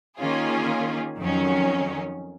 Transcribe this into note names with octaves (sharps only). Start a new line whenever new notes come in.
D#3 A#3 C#4 F4 G#4
F2 D#3 F#3 C#4